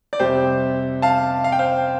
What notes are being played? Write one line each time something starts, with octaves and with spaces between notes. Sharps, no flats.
D5
F2 C3 G3 G4 C5
F5 A5
F5
G5
C5 F5